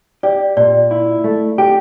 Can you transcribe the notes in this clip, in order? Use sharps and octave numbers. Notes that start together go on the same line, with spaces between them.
G4 D5
A#2 D5
E4
A3
G4